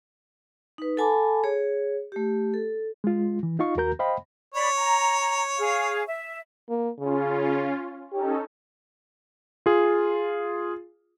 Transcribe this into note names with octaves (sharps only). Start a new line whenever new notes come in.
D#4 B4
A4 F#5 G#5 A5 B5 D6
G#4 C#5
A3 G4
A4
G#3 F4
E3
D#4 F4 D#5 F5 C#6
D#2 D#3 F#4 A#4 A#5 G6
C5 D#5 F5 G5 B5
C#5 D5 B5
A#5
G#4 F5
E5
A#3
C#3 C#4 F4
C#4 D#4 G4 A4
F4 G#4